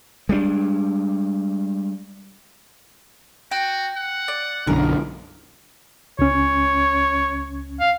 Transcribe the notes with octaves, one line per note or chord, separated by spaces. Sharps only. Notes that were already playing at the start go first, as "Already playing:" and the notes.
G3 G#3 C4 D4
F#4 G5
F#5
D5
B1 F#2 D3 A#4
C#2 C#4 C#5
F5